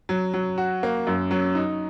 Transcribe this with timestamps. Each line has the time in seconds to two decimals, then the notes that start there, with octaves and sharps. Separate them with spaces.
0.09 F#3
0.33 F#3
0.58 F#4
0.83 A#3
1.07 F#2
1.31 F#3
1.55 D#4